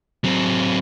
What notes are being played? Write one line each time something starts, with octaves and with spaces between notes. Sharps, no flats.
F#3 C4